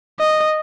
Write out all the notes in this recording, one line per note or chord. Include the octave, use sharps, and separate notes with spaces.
D#5